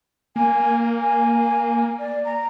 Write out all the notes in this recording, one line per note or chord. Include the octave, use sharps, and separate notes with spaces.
A#3 G#5
G#5
D5
A#5